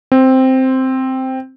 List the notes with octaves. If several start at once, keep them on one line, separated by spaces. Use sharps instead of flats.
C4